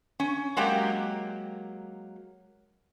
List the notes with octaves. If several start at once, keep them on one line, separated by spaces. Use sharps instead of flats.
C#4
F#3 G#3 A#3 G4 G5